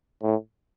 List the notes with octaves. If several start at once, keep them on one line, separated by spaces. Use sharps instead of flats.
A2